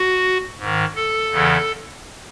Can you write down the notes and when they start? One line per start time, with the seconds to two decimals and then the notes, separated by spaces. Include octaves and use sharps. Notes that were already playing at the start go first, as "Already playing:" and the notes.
Already playing: F#4
0.59 G#2
0.64 D#3
0.96 A4
1.31 E2 C#3 E3